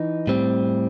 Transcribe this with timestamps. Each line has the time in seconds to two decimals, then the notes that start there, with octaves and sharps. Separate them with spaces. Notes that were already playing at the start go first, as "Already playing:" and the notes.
Already playing: E3 D#4
0.27 A2 G3 C4